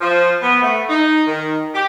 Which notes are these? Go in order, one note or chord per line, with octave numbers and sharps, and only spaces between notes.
F3
B3
A3
D#4
D#3
G4